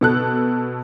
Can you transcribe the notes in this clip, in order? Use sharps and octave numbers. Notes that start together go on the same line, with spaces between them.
B2 A4 F#6